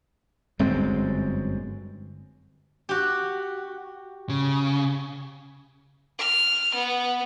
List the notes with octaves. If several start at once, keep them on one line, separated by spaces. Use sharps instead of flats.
G1 F#2 G#3 C4
F#4 G4
C#3
F6
B3